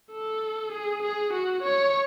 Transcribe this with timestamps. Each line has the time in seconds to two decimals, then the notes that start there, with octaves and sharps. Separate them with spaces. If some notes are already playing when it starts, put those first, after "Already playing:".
0.12 A4
0.72 G#4
1.03 G#4
1.33 F#4
1.63 C#5